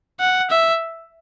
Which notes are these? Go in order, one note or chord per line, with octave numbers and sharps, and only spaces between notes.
F#5
E5